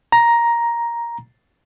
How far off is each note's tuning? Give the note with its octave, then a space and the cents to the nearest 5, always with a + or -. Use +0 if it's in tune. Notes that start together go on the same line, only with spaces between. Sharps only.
A#5 +10